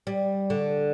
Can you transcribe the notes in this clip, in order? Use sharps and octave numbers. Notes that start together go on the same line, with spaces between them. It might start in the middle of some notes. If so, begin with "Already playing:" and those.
G3
D3